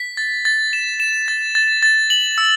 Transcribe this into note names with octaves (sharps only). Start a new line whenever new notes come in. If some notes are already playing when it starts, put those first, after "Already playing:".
Already playing: B6
A6
A6
E7
E7
A6
A6
A6
F#7
E6